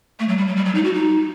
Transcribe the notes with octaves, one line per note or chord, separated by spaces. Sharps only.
A3
F#3
G3
F#3
G3
F#3
D#4
F#4
D#4